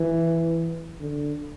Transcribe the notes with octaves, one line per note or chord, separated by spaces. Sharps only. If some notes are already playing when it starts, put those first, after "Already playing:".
Already playing: E3
D3